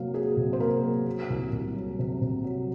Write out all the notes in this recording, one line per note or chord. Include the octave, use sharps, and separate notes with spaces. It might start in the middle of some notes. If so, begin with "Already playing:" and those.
Already playing: C3 F#3 A#3 F5
F#3 G#4
C3
C5
A#3 A#4
F#3
F#3
C2
C2
F#3
C3
C3
F#3